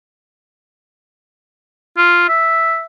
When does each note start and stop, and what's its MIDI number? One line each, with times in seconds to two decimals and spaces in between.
1.98 2.24 65
2.29 2.84 76